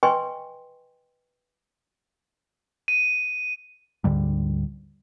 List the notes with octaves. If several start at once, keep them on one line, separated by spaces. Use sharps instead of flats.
B4 D#5 G5 G#5 C6 C#6
D#7
D2 G#2 D3 G3